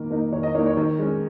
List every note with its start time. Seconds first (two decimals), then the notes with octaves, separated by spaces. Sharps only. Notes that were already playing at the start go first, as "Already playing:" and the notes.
Already playing: D#3 A#3
0.10 A#3 D#4
0.32 D#3 C#5
0.43 D#5
0.54 A#3 D#4 C#5
0.66 C#5
0.77 D#3
0.99 G#3 C#4